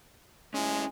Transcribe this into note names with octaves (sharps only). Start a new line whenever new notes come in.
G#3 C#4 E4 G#5